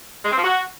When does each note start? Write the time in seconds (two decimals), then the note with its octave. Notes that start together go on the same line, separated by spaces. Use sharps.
0.25 G#3
0.31 C4
0.37 F3
0.44 F#4